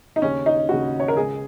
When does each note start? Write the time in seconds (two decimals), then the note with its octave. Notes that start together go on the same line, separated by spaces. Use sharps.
0.16 D#4
0.22 D#2 C#3 C#4
0.46 D#4
0.69 D#2 C#3 F#4
1.00 C#5
1.08 A#4
1.17 C#2 C#3 G#4